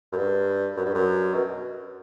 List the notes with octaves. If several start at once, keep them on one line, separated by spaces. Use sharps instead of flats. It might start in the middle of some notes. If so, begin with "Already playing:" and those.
F#2
G2
F#2
G2
F#2
B2